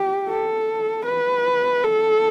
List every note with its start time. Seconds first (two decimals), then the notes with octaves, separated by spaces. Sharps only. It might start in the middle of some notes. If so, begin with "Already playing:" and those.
Already playing: G4
0.29 A4
1.06 B4
1.84 A4